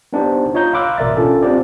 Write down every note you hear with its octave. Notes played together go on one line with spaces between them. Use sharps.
B3 D4 D#4 G4 C5
F4 C#5 D#5 A#5 G6
F5 B5 C6 D6 E6 F#6
A1 B2 A#4 D5 E5 A6
C#4 D4 F4 A4
C4 D4 F4 G4 C5 D5